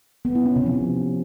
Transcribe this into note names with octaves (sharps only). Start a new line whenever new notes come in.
B3
E4
C#4
C3
F3